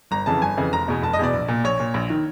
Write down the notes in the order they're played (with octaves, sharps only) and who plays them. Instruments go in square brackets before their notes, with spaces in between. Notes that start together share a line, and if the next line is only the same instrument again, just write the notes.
[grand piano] G1 A#5
F2 C#3 E3 A5
G1 G#5
F2 C#3 E3
F1 A#5
E2 B2
F1 A5
D#5
E2 B2 D5
A#1
A#2
A#1 C#5
A#2
A#1
D#3